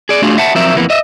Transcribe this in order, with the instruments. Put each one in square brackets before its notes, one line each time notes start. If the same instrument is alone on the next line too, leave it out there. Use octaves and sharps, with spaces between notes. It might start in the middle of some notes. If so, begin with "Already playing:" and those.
[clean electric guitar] G#4 D5
A3 D4 F4 F#4 G#4
E5 F#5 A5
F3 F#3 C4 A#4 E5
F2 E3 A#3 B3
D#5 E5